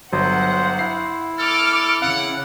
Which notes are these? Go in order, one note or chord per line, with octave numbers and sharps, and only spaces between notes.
G1 F#3 C5 F#5
E4 C7
A4 D6 F6
C#3 F5 F#5